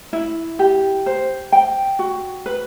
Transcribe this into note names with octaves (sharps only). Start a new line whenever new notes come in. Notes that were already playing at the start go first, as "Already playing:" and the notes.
E4
G4
C5
G5
F#4
B4